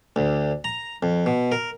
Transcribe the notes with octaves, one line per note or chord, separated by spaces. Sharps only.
D2
A#5
F2
B2
A#4